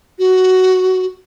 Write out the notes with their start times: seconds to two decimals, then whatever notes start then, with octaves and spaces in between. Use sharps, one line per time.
0.19 F#4